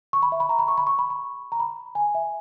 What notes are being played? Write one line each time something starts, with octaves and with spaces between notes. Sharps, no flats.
C#6
B5
E5
B5
A#5
B5
C#6
B5
C#6
B5
B5
A#5
B5
G#5
E5